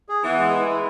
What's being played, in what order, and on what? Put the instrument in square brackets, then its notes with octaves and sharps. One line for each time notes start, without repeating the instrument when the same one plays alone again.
[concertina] G#4
[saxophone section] E3 [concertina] B3
[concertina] G#3
E4
G#3